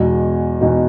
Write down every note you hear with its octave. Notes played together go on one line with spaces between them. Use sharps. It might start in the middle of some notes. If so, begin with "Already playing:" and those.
Already playing: E2 B2 G#3 D#4 F#4
E2 B2 G#3 D#4 F#4